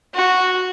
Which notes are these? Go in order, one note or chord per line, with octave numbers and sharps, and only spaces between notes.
F#4